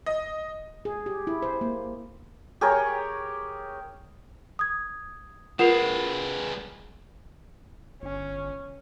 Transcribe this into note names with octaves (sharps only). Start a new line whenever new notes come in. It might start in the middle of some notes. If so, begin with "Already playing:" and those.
D#5
G#4
G4
E4
C5
A#3
G4 G#4 A#4 C#5
D#6 G#6
G#3 F4 A#4 B4 F#5 C7 F7
G1 C#4